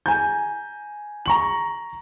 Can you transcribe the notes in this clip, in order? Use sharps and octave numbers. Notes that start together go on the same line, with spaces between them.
G#5 A#5 G6
A#5 C#6 F#7